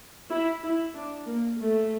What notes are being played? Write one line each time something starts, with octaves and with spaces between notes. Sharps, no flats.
E4
E4
D4
A#3
A3